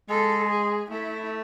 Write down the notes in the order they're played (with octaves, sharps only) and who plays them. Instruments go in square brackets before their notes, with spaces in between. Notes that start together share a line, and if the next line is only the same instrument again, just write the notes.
[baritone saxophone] G#3 [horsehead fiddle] A4
[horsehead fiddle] G#4
[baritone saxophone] A3 [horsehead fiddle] E4